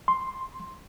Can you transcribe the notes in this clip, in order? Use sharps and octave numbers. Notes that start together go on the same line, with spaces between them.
C6